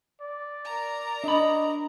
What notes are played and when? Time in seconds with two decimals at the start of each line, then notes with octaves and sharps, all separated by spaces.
0.21 D5
0.64 A#4 A#5
1.24 D4 D#5 B5